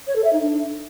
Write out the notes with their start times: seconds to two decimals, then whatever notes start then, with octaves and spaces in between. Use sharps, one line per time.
0.07 C#5
0.16 A4
0.24 E5
0.33 D#4
0.41 D4